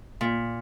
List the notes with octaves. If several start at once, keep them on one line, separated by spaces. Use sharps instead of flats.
A#2